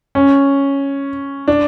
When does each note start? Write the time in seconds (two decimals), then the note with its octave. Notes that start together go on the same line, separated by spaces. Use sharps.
0.15 C#4
1.48 D4